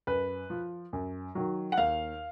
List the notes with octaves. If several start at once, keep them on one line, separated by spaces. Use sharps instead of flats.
F#2 B4
F3
F#2
D#3 F#3
F#5
D#2 F5